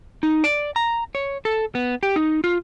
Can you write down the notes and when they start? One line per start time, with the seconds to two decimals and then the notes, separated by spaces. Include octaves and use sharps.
0.23 D#4
0.44 D5
0.76 A#5
1.15 C#5
1.45 A4
1.75 B3
2.03 G4
2.16 D#4
2.44 F4